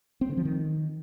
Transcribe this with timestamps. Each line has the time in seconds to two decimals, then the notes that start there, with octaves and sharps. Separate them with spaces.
0.21 C4
0.29 D3
0.37 F3
0.45 D#3